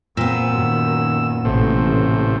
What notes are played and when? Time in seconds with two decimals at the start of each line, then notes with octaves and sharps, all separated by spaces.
0.17 A#2 B3 C4 E6
0.51 F#2 D#3
1.45 A1 A2 C3